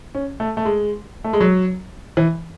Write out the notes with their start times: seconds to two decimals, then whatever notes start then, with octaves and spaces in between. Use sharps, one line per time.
0.15 C#4
0.40 A3
0.57 A3
0.65 G#3
1.24 A3
1.33 G#3
1.41 F#3
2.17 E3